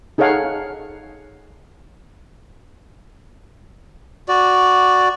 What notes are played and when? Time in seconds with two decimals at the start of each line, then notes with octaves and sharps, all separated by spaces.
0.18 D#4 G#4 A4 C#5 F5 F#5
4.28 F#4 D5